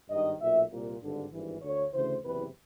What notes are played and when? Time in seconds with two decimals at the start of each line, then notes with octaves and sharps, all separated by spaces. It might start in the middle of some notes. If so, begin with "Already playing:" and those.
0.09 G#1 G2 D#3 D#5
0.41 B1 A#2 E5
0.71 C2 A#2
1.01 G#1 G2 D3
1.32 G#1 G2 E3
1.62 D2 D3 C#5
1.92 D2 C#3 E3 C5
2.23 F#1 E2 C3 E3 B4